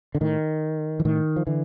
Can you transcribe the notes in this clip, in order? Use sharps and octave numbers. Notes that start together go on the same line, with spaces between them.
D3
A2 D#3
E3
A2 D#3
F3
D3 E3